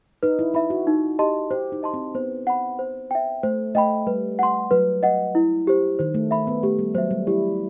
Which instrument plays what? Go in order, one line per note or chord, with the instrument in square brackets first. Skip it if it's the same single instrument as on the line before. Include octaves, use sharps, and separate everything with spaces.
[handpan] D#4 [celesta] B4
[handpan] E4
[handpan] E4 [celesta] E5 B5
[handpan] F#4
[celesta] D#4
G4 D#5 A5 C6
[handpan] G4 [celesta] C5
[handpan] D#4
[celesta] D#5 A5 C6
[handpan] C4
[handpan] B3 [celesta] C5
[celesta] F#5 B5
C5
E5 G5
[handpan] A3 [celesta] C5
[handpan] A3 [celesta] D#5 G5 B5
[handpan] G3 [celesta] B4
[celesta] F#5 C6
[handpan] F#3 [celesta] B4
[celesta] D#5 F#5
E4
G4 C5
[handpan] D#3 [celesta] C5
[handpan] A3
[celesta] E5 B5
[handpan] B3
[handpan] A3 [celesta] G4
[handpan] G3
[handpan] F#3 [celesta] C5 E5
[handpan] G3
[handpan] E4 [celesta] G4